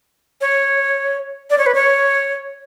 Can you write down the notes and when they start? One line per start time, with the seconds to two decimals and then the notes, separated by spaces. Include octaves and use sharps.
0.41 C#5
1.50 D5
1.58 C#5
1.66 B4
1.75 C#5